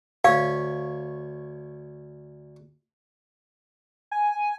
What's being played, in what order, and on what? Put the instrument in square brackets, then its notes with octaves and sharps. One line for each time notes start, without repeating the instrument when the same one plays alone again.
[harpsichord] D2 C#5 G#5 [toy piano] F5
[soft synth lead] G#5